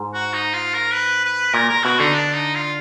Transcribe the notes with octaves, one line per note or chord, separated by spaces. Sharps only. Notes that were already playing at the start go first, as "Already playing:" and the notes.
Already playing: G#2
F#4
D#4
F4
A#4
B4
B4
A#2 A#4
A#4
B2 F#4
D3 D#4
D4
D#4
F4